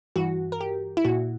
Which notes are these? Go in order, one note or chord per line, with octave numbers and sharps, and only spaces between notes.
G2 E3 F#4
A#4
G4
E4
A#2 F#4